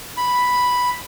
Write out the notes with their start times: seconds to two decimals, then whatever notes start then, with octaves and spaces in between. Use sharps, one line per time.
0.17 B5